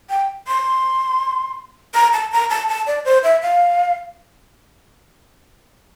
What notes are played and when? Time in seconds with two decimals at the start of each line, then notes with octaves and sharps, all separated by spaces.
0.10 G5
0.48 C6
1.95 A#5
2.13 A5
2.32 A#5
2.50 A5
2.69 A5
2.87 D5
3.05 C5
3.24 E5
3.42 F5